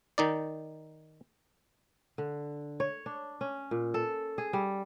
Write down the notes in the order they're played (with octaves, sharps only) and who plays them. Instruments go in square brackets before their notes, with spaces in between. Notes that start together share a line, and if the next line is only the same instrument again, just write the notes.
[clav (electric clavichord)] D#3 D#4 D5
[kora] D3
C#5
D4
C#4
A#2
A4
G#4
G3